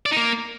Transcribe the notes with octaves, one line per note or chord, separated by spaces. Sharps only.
D5
D#4
A#3